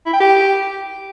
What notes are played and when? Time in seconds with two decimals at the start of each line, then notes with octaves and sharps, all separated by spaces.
0.06 E4
0.13 G5
0.20 G4